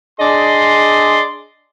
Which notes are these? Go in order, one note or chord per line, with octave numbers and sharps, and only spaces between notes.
D4 G#4 D5 D#5 C6